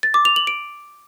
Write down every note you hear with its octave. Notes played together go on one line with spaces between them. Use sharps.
A6
D6
F7
F#7
D7